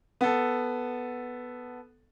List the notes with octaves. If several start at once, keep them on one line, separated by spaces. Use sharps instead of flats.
B3 A4